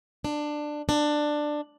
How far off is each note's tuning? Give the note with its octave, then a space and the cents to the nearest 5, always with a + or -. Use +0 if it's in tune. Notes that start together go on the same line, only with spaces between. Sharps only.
D4 +15
D4 +15